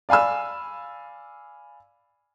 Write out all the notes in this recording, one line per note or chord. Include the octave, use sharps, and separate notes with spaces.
D5 F5 G#5 B5 E6